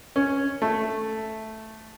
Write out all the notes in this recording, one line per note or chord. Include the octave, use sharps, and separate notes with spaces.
C#4
A3